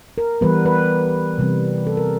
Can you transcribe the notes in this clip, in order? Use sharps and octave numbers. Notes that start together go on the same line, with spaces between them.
A#4
E3 G3 B3 B4
B4
C3 E3 G3 C4
A4
A#4